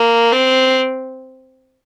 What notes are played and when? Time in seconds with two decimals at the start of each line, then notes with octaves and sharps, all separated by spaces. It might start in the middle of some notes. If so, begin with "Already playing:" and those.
Already playing: A#3
0.32 C4